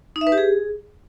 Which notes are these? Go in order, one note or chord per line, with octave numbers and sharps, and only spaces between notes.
D#4
E5
B4
G4
G#4